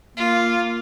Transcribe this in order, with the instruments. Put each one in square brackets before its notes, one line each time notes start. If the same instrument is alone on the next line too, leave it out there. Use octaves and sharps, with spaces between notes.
[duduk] A#3 [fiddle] F4